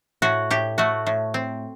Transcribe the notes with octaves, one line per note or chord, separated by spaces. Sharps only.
A2 F#4
A2 G4
A3 F#4
A2
C4